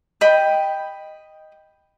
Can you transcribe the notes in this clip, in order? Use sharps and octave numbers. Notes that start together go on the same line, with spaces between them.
D#5 G5 B5